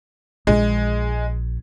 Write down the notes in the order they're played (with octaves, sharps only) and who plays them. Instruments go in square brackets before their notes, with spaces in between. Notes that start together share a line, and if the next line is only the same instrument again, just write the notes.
[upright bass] A#1 [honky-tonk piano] G#3